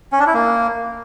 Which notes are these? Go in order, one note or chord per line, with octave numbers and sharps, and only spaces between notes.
C#4
D4
E4
A#3